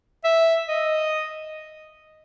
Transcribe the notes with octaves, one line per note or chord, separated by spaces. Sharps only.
E5
D#5